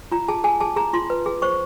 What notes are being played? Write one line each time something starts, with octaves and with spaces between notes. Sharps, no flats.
F4 A#5
G#4 A5
G#4 G#5
G#4 A5
G#4 A#5
F4 C6
B4
G#4
C5 C#6